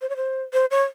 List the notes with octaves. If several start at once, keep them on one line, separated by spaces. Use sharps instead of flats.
C5
C#5
C5
C5
C#5